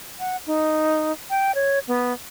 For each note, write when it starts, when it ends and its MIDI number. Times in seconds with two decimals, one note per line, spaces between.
0.19 0.37 78
0.46 1.12 63
1.30 1.54 79
1.55 1.79 73
1.87 2.13 59